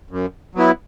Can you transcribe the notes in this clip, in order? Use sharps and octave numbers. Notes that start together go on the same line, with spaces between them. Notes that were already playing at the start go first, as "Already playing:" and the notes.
F#2
F#3 B3 E4